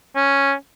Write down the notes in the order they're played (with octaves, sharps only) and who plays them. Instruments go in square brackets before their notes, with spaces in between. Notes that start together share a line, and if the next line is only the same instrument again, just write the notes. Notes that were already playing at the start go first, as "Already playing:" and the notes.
[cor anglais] C#4